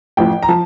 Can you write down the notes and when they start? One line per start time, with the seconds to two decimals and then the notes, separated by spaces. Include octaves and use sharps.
0.17 A1 A2 F3 G5
0.43 A#5
0.48 F3 A5